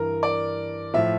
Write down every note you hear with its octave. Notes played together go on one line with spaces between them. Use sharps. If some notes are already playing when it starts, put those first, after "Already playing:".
Already playing: G2 E3 A#4
D5
A2 F3 E5